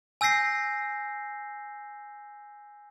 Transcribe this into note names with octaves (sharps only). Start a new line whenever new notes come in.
G#5 E6 G6 A#6 C7